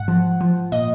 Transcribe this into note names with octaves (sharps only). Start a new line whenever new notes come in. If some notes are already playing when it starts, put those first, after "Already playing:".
Already playing: G#2 F#5
F3
F3
A#2 D#5